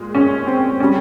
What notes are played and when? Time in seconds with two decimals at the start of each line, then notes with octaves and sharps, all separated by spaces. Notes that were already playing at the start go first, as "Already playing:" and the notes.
Already playing: A#2 G#3
0.15 C#4
0.47 C4
0.80 G3 C#4